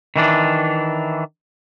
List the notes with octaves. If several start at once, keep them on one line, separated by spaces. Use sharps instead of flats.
D#3 E3 D4